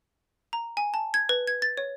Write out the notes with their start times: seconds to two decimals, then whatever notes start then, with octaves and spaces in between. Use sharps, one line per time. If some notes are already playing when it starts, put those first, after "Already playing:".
0.53 A#5
0.77 G#5
0.94 A5
1.14 G#6
1.29 B4
1.47 G#6
1.62 A6
1.77 C#5